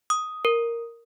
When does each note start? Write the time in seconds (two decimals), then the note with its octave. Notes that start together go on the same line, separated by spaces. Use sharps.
0.10 D#6
0.45 A#4